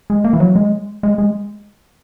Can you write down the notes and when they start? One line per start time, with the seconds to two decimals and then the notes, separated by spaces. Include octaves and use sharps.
0.10 G#3
0.24 A#3
0.33 E3
0.40 F#3
0.56 G#3
1.03 G#3
1.18 G#3